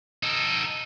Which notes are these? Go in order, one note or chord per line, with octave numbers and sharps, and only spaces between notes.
D#4 A4